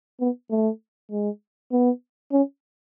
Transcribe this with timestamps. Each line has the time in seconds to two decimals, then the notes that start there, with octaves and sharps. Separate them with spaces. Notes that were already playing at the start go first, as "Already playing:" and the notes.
0.21 B3
0.51 A3
1.11 G#3
1.72 B3
2.33 C#4